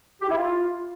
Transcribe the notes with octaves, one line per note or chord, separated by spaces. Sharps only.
G4
E4
F4